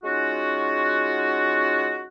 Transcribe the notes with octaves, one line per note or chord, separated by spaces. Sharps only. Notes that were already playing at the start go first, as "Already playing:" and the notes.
G#3 C#4 D#4 F4 F#4